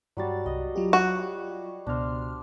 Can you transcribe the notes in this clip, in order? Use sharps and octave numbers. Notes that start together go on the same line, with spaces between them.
G2 F#3 G3 F#4 A6
C2 D#5
F#3 F4 G4
F#4 C#5 F5
C#2 B2 D4 C5 F6